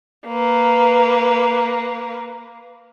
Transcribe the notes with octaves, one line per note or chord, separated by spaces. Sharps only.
A#3 B4